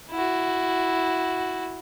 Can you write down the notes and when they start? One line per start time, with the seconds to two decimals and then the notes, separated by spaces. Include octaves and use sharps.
0.11 E4 F#4